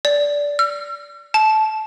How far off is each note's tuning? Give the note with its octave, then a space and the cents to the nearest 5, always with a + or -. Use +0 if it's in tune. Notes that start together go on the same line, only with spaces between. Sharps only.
D5 -15
E6 +45
A5 -20